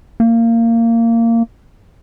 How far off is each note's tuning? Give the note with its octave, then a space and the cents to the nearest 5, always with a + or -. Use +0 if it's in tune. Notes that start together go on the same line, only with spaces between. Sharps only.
A#3 -20